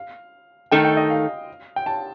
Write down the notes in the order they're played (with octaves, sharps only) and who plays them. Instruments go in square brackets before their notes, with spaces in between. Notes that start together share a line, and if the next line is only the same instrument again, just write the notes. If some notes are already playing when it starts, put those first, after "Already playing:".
Already playing: [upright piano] F5
[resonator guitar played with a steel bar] D#3 A3 D#4 A4 [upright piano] G5
[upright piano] G5
D#5
F5
G5
A5